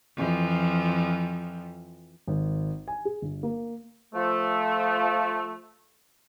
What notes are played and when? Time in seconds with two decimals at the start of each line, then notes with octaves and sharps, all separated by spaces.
0.17 F2 E3 F3
2.28 G#1
2.88 G#5
3.05 G#4
3.22 G1
3.43 A#3
4.15 F3 A3